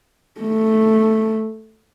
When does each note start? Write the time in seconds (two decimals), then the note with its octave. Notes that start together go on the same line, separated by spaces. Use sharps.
0.41 A3